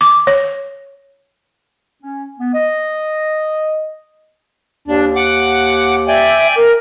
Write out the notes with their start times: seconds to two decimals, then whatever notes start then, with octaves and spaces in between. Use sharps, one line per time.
0.01 D6
0.27 C#5
2.03 C#4
2.39 B3
2.54 D#5
4.88 D#2 D4
5.16 F#5 D6
6.08 D5 E5 G5 G#5
6.56 A#4